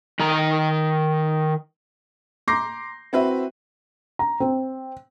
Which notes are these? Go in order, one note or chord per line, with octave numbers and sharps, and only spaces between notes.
D#3 A#5
A#5 C6 D6 G6 A#6 C7
C4 E4 F#4 B4 E5
A#5
C4